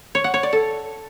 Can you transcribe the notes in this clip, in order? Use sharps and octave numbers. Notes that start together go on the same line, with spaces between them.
C#5
F#5
C#5
D5
A4